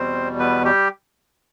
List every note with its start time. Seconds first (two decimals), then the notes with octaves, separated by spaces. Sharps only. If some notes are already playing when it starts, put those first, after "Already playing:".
Already playing: E2 B2 G3 C4 C5
0.39 B3 B4
0.65 G3 G4